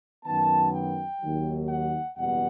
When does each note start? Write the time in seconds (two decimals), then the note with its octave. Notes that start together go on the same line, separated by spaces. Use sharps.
0.25 F#2 D#3 F#3 B3 A5
0.73 G5
1.22 D#2 D#3 F#3
1.69 F#5
2.17 F#1 E2 B2 G3 B3 F#5